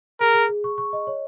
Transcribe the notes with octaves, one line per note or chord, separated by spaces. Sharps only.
G#4 A#4
G#4
G#4
C#6
C#6
D#5
C#5